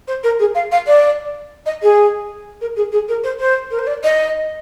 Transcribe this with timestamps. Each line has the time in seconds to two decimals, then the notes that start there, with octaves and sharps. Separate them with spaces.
0.07 C5
0.23 A#4
0.39 G#4
0.55 F5
0.71 F5
0.87 D5
1.65 D#5
1.82 G#4
2.61 A#4
2.76 G#4
2.92 G#4
3.08 A#4
3.23 C5
3.39 C5
3.71 A#4
3.79 C5
3.87 D5
4.03 D#5